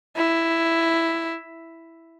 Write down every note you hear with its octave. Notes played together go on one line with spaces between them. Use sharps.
E4